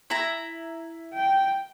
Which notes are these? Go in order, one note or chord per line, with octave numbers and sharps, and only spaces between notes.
E4 A#5
G5